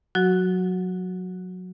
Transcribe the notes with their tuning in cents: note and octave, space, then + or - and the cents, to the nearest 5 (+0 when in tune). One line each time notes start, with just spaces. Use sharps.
F#3 -20 F#4 +0